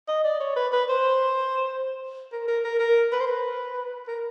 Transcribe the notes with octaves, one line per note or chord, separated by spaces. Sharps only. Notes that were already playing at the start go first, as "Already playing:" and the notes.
D#5
D5
C#5
B4
B4
C5
A#4
A#4
A#4
A#4
B4
C5
B4
A#4